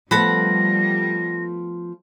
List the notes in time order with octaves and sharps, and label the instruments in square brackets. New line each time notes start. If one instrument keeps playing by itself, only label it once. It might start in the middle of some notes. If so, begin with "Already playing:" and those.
[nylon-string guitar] F3 A3 B3 [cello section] G3 [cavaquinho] A4 F#5 B5 [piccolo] A#6